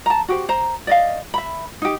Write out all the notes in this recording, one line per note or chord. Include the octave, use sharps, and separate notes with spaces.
A5 A#5
F#4 G4 C5
C5 A#5
D5 D#5 F5
E5 B5
D#4 G4